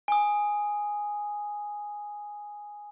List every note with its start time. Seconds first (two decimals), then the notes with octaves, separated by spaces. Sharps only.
0.08 G#5 D#6